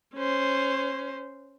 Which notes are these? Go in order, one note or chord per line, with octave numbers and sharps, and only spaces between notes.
C#4 C5